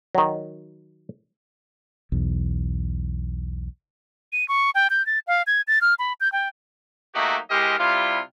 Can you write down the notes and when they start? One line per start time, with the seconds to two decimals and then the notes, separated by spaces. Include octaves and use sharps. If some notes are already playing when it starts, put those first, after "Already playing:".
0.15 D#3 F#3
2.12 B1 E2
4.33 D#7
4.48 C#6
4.75 G5
4.90 G6
5.06 A6
5.27 F5
5.47 G#6
5.68 A6
5.81 F6
5.99 B5
6.21 G6
6.32 G5
7.15 F#3 A3 A#3 D#4 F#4 G4
7.50 E3 G#3 G4 A#4 C5 D#5
7.78 C3 G3 E4 F4